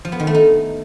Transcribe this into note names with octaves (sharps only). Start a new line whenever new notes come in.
F3
B3
D#3
A3
D#4